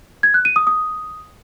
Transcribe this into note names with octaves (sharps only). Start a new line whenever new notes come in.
G#6
F#6
D#7
D#6
D#6